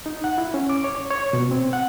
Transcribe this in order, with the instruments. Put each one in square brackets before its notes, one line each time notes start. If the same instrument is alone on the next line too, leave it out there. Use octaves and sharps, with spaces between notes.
[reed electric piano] D#4
F#5
E4
C#4
D6
C#5
C#5
B2
C4
F#5